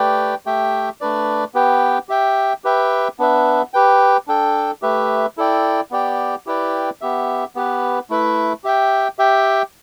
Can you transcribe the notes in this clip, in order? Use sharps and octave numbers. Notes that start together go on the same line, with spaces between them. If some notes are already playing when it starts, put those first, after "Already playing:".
Already playing: A3 G4 B4 D5 G5
A3 G4 E5 G5
A3 D4 B4 D5
B3 G4 B4 G5
G4 E5 G5
G4 B4 E5 G5
B3 D4 B4 E5
G4 B4 G5
D4 A4 G5
A3 G4 B4 E5
E4 A4 D5 G5
B3 G4 D5 G5
E4 G4 B4 D5 G5
B3 G4 E5
B3 G4 B4
A3 E4 B4 E5
G4 E5 G5
G4 E5 G5